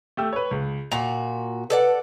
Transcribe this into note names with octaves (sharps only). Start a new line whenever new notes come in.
A3 G4 E6
B4 C#5
C#2
A#2 F#4 F7
A4 B4 D5 F#5